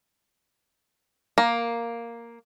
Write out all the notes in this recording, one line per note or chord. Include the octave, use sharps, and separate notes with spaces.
A#3